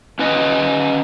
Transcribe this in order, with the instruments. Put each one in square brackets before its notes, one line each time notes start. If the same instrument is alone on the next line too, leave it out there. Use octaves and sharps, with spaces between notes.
[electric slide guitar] C#4 B4 D#5